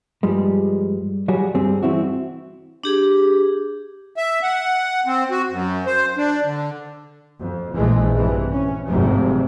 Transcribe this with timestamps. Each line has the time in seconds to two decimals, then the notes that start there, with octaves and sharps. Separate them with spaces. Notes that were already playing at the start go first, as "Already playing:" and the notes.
0.23 G2 F3 G3 G#3
1.28 F#3 G3 F#4 G#4
1.55 G2 G3 C4 G#4
1.83 E3 C4 E4 F#4
2.84 D4 G4 G#4
4.16 E5
4.43 F#5
5.06 C4
5.31 F#4
5.49 F#2
5.86 C5
6.16 D4
6.44 D3
7.39 F2
7.75 A#1 E3 G#3 A3
8.15 G2 C3 E3
8.51 C#4
8.88 G#1 F2 G#2 C3 F#3 A3